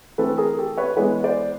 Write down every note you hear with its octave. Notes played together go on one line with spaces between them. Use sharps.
E3 A3 C4 A4 B4
G#4 A#4
G4 A4
B4 C#5
E3 G#3 B3 B4 C#5
C5 D5